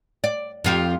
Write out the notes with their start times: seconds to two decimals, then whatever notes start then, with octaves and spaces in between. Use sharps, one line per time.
0.24 D5
0.64 F2 F4 G4